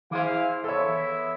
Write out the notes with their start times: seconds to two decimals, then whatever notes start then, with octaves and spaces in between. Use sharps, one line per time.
0.11 E3 E4 G#4 C5 F5
0.64 B3 E4 A4 C#5 E5